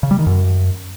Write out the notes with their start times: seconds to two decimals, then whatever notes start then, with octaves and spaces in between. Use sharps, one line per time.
0.03 C#3
0.11 G3
0.19 D#3
0.27 F#2